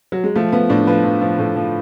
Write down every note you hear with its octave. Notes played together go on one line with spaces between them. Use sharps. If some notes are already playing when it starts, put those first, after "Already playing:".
F#3
G#3
F3 A3
F3 B3
A2 D4
F3 B4
F3
F3
A2
F3